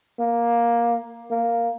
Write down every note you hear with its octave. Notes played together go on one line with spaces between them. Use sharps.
A#3
A#3